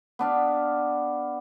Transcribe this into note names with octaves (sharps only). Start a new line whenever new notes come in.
B3 D4 F5